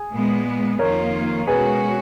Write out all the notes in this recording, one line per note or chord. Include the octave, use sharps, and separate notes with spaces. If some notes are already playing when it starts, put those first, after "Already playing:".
Already playing: G#4
A#2 G#3 B3
F2 D#3 A#3 F4 A#4 C#5
B2 G#3 C#4 F#4 G#4 B4